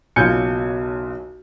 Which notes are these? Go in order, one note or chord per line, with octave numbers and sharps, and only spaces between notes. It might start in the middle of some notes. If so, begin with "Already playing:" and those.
F#1 B1 F4 G#5 G6 C#7